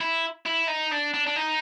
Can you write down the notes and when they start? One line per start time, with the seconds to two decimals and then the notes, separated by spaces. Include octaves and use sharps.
0.01 E4
0.46 E4
0.68 D#4
0.92 D4
1.14 D4
1.27 D4
1.36 D#4